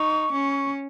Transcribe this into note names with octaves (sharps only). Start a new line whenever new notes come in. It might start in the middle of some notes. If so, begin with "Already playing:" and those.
Already playing: D#4 C#6
C#4